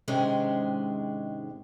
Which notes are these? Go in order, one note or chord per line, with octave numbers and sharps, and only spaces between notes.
G#2 C3 D#3 G#3 C#4 D4